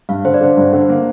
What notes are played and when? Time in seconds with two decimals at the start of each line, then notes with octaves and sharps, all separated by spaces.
0.09 G2 F5
0.25 D3 C5
0.34 D5
0.41 D3 C5
0.57 G2
0.73 D3
0.89 A#3